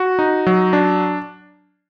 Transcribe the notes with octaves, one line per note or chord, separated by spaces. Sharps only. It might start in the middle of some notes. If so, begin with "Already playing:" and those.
Already playing: F#4
D#4
F#3
D4